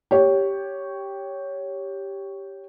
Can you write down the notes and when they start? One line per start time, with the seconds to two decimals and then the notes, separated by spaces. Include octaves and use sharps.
0.11 G4 C#5